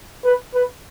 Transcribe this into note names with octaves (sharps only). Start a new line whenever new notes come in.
B4
B4